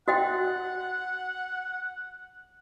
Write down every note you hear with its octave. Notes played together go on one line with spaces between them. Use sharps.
F#4 D#5 F#5 G5